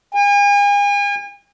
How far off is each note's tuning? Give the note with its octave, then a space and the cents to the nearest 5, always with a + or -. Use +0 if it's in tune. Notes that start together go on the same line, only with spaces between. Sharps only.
G#5 -40